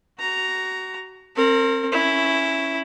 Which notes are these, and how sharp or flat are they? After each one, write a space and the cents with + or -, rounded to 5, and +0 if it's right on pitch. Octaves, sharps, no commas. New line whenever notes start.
F#4 +25 A#5 +0
C4 +35 A#4 -30
C#4 +0 E4 +0